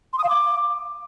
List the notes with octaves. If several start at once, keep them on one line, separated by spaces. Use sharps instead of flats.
C6
D#6
F5
D6